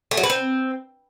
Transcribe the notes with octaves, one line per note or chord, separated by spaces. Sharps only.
A3
F#3
B4
C4